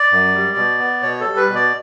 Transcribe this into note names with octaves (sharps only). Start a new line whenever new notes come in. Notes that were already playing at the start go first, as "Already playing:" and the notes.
Already playing: D5
F#2
G3
B2
B3
B2 C#5
A4
G3
B4
B2
D5